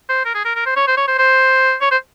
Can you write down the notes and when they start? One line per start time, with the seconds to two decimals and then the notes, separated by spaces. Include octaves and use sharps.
0.09 C5
0.25 A#4
0.35 G#4
0.45 A#4
0.55 A#4
0.66 C5
0.76 C#5
0.87 C5
0.97 C#5
1.08 C5
1.18 C5
1.81 C#5
1.91 C5